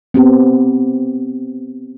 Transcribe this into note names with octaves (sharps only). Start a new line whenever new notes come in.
B3 C4 G4